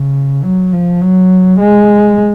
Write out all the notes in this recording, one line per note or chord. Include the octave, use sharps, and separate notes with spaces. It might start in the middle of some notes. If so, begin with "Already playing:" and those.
Already playing: C#3
F#3
F3
F#3
G#3